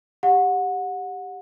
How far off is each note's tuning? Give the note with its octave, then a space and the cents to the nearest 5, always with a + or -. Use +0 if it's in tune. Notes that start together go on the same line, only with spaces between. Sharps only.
G4 +10 F#5 -25